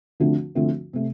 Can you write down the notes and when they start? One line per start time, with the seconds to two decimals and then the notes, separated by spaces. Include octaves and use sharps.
0.20 D2 D3 F3 A3 C4
0.55 D2 D3 F3 A3 C4
0.93 C3 A3